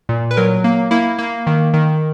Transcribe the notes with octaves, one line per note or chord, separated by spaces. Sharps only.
A#2
B4
F#3 A#4
A#3
A#3 E4
A#3
D#3
D#3